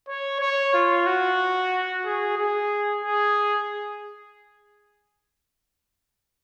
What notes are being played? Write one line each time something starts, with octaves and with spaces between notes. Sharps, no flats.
C#5
C#5
F4
F#4
G#4
G#4
G#4